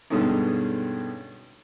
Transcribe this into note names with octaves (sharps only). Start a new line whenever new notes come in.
G2 B2 D3 G#3 C#4 D#4